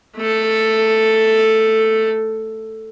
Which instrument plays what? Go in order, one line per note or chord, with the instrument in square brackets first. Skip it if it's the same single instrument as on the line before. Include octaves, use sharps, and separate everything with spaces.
[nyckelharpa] A3 A4